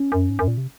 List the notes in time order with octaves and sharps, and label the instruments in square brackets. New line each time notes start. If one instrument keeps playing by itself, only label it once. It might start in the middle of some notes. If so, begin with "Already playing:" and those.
Already playing: [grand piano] C#4
[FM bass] F#2
G#2
F#2
A#2
C3